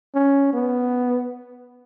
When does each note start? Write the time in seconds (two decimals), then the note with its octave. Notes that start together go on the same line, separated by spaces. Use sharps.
0.15 C#4
0.54 B3